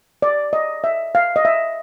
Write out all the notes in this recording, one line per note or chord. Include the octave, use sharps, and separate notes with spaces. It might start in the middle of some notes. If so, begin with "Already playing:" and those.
D5
D#5
E5
F5
D#5
E5